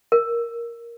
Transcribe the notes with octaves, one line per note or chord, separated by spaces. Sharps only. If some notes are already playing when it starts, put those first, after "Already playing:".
A#4